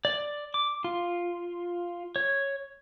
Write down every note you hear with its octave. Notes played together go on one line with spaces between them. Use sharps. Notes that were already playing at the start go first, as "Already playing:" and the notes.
D5
D6
F4
C#5